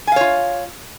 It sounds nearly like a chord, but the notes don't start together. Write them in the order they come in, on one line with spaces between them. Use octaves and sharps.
G#5 F5 C#5 F4